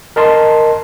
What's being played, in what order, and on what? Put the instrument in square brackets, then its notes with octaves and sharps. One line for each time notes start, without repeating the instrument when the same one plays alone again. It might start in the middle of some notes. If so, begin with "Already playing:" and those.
[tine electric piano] A#4 D#5 A5 C6